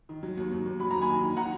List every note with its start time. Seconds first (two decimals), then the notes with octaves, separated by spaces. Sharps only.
0.09 D#3
0.23 F#3
0.37 D#2
0.52 D#2
0.66 D#2
0.79 F#3 B5
0.91 D#2 A#5
1.01 G#5 B5
1.09 D#3
1.23 D#3
1.37 F#3 F#5 A#5